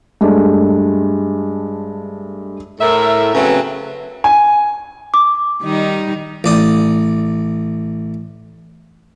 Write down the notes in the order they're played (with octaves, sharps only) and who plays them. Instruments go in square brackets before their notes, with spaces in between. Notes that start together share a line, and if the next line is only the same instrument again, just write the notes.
[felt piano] G2 G#3 A3
[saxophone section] A2 A#4 E5
C#3 F#3 A3 B3 C4 B4
[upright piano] G#5
[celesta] D6
[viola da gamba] D#3 G3 D#4
[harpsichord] A1 D5 D#6